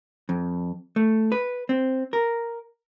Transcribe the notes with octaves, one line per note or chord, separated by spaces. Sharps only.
F2
A3
B4
C4
A#4